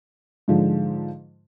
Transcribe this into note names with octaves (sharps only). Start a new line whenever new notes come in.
G#2 D3 F3 G#3